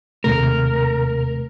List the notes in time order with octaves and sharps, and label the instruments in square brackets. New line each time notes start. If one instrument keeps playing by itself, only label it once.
[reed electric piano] D#2 C3 A3 [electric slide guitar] A#4